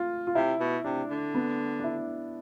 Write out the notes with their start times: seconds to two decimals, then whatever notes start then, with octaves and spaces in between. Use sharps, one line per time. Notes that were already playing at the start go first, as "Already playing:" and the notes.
Already playing: F4
0.27 F4
0.35 C3 E4
0.60 B2
0.84 C3 D4
1.10 D3
1.35 B3
1.80 D4
1.84 E4